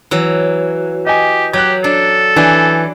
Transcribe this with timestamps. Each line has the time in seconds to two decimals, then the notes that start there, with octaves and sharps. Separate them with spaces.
0.11 E3 F#3
1.06 G4 D#5 G#5
1.53 F#3 G4 F#6 G#6
1.84 D4 A4
2.36 E3 D4 G#5